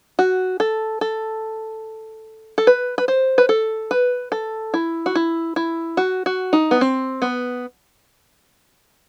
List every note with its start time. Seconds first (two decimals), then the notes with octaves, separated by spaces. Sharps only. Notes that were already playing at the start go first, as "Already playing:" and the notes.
0.19 F#4
0.60 A4
1.01 A4
2.58 A4
2.67 B4
2.98 B4
3.08 C5
3.38 B4
3.49 A4
3.91 B4
4.32 A4
4.74 E4
5.06 F#4
5.15 E4
5.56 E4
5.97 F#4
6.26 F#4
6.53 D#4
6.71 B3
6.81 C4
7.22 B3